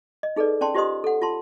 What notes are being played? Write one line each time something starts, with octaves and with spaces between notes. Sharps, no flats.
D#5
D#4 G#4 A4 B4 D5
C#4 D5 G5 A5 C6
F4 G4 C5 D#5 C6 D#6
A4 F#5
F4 A5 C6